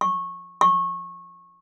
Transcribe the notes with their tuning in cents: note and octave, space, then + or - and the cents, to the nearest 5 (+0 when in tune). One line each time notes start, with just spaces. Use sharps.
C#6 -15
C#6 -20